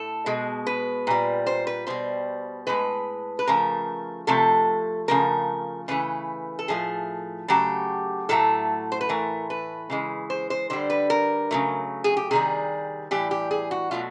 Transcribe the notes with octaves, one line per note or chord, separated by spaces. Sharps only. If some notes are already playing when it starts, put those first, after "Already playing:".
Already playing: A2 A3 A4
B2 G#3
B4
A#2 G3
C5
B4
B2 G3 C5
A2 F3 G#3 B4
B4
C#3 F3 A3 A#4
C3 F3 A3 A4
C#3 F3 A3 A#4
C#3 E3 A3 B4
A4
A2 F3 A3 G#4
C#3 F#3 A3 G4
A2 F#3 A3 A4
C5
B4
A2 E3 A3 A#4
B4
C#3 E3 G#3
C5
C5
D3 G3 C5
B4
A#4
C#3 F#3 A3
G#4
G4
C3 D#3 G3 G#4
A2 E3 G3 G4
G4
G#4
F#4
B2 F#3 A3 F4